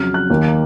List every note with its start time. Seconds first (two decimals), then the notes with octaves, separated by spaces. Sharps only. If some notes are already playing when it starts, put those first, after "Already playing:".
Already playing: F2 C#3 F#3 F6
0.14 F#6
0.30 D#2 D#3 A#3